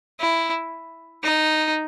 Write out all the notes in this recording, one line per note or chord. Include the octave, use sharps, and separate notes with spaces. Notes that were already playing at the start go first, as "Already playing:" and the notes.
E4
D#4